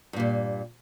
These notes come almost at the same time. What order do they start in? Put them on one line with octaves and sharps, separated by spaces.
G2 A#2 G3